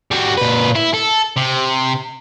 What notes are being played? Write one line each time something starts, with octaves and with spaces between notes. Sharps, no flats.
G3 F#4
A#2 B4
E4
A4
C3